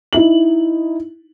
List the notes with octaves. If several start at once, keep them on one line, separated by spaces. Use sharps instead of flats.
D#4 E4 F#7